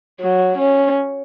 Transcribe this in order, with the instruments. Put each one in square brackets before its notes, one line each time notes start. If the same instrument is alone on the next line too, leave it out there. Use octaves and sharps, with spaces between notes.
[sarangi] F#3
C#4